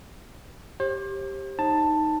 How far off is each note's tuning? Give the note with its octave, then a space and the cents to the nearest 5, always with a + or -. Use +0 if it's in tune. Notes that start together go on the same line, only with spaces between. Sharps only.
G4 +0 C5 +40
D#4 +0 A5 +10